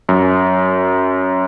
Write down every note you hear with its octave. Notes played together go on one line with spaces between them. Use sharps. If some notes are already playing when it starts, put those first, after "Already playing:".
F#2